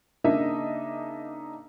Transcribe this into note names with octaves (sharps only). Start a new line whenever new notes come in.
C#3 A#3 D4 D#4 D#5 E5